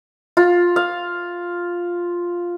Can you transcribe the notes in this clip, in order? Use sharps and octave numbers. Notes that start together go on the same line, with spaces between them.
F4
F5